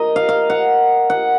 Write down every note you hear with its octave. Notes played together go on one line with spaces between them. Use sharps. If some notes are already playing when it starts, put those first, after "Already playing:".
Already playing: A#4 D#5
F5
F5
F#5
F#5